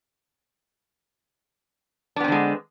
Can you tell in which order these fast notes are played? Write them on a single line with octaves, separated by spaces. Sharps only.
D4 B3 C4 D3 G#3